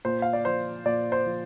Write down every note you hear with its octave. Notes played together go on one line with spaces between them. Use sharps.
A#2 C5
F5
D5
F3 C5
A#2 D5
C5
F3